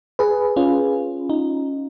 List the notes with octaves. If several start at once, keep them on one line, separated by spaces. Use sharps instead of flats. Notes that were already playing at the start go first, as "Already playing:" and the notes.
G#4 B4
C#4 F4
D#4